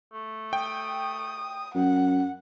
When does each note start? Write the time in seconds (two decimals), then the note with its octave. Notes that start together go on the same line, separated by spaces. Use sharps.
0.13 A3
0.53 G5 D#6
1.75 F#2 F#5